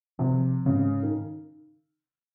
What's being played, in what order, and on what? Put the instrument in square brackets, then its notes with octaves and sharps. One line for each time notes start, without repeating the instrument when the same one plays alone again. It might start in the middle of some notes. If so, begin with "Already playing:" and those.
[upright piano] C3 [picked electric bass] F3
[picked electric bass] G#2 [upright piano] C#3
[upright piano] D#3